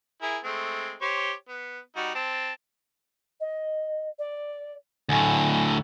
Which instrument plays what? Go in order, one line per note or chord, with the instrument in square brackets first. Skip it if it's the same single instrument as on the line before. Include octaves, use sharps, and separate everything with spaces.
[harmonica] E4 G#4 A#4
G#3 A3 C4
G4 C5 C#5
B3
G3 D#4 F#4
C4 A5
[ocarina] D#5
D5
[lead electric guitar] D2 A2 [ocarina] G#5